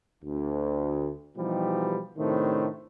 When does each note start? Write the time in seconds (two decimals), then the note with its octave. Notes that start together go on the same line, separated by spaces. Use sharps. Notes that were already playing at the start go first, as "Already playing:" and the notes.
0.23 D2
1.37 B2 E3 F3 G3 D#4 G4
2.18 A2 C3 D#3 A3 D4 C5